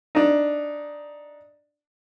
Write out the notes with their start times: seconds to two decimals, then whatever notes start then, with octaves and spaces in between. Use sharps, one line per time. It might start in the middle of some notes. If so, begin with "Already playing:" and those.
0.15 D4 D#4